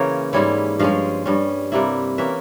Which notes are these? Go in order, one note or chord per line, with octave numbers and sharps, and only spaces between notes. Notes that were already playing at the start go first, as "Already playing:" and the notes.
Already playing: C#3 E3 A#3 C#4 C#5
G#2 G3 C#4 E4 C#5
G2 F3 G#3 C#4 F5
G2 G3 C#4
C3 G3 A#3 E4
E3 A#3 C#4 E5